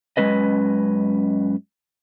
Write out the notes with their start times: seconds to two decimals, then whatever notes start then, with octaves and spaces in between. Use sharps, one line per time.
0.17 F#2 G#3 C#4 B4 D#5